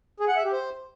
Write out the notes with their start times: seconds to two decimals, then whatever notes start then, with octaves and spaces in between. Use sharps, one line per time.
0.20 G#4
0.28 F#5
0.36 E5
0.44 G4
0.53 C5